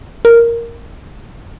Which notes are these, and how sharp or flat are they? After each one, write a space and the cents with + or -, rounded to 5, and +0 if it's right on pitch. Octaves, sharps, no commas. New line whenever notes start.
A#4 -5